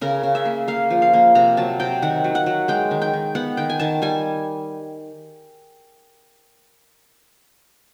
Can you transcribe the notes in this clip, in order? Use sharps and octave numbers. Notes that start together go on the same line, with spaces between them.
C#3 A#4
C#3
E5
A#3
A#3 F5
F3
F5
A#3
C3 A#5
F#3 A5
C3 G5
D#3 F#5
F#3
F#5
F#3
G#3 G5
D#3
G5
D#3
B3 F#5
D#3 G5
G#5
D#3 A5
G3 G#5